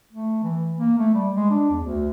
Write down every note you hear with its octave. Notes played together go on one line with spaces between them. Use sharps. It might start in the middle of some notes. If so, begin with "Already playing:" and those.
A3
E3
A#3
A3
G3
G#3
D4
E2
D2